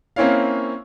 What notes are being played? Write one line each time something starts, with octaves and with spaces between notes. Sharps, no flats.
A#3 C4 C#4 E4 C#5 F5